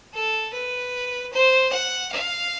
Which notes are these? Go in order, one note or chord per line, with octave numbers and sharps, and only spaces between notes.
A4
B4
C5
F#5
F5